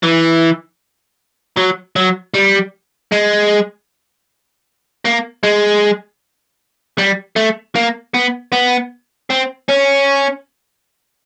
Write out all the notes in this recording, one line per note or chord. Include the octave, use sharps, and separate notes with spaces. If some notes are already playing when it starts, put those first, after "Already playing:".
E3
F#3
F#3
G3
G#3
A#3
G#3
G3
A3
A#3
B3
B3
C4
C#4